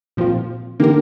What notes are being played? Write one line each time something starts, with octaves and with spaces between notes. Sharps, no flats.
A#2 F3 C4 F4
D3 A#3 G4 A#4